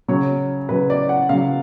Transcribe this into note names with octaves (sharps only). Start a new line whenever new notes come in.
C#3 F#3 C#5
C#3 F#3 B4
D5
F#5
C#3 F#3 F5